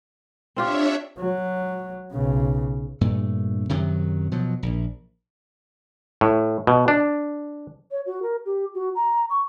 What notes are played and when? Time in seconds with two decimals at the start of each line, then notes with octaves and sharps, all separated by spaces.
0.56 C4 D4 F4 G4 C#5 E5
1.19 F#3
2.12 B1 C#3
3.01 G2 A#2 A3
3.69 F#2 C3 D#3 F#3
4.32 B2 F3 F#3
4.63 A#1
6.21 A2
6.67 B2
6.88 D4
7.91 C#5
8.06 F#4
8.22 A#4
8.46 G4
8.74 F#4
8.95 A#5
9.30 C#6